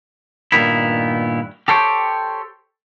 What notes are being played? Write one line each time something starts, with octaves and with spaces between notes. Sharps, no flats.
G2 A#2 D#3 B3 E4
G4 A4 C5 C#5 G5